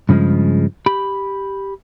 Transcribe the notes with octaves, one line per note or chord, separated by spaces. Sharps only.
G2 C#3 F3 G3 G#3
G4 B5